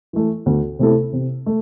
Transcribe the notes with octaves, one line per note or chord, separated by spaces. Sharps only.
E3 A3
D2
C3 A3 E4 A4
C3
A3